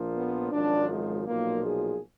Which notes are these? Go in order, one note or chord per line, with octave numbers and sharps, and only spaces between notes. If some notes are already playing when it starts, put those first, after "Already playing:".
Already playing: A#1 A#2 F3
B3
G#1 F#2 F3 D4
G#3
B1 A#2 F3 A#3
G#4